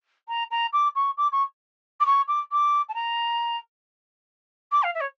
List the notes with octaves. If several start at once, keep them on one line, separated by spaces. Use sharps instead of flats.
A#5
A#5
D6
C#6
D6
C#6
D6
C#6
D6
D6
A5
A#5
D6
F5
E5
C#5